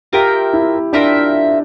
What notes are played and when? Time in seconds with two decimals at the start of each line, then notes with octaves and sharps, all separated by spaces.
0.13 F4 G4 A#4 E5 G5
0.53 E4
0.93 D4 F4 A#4 E5 G5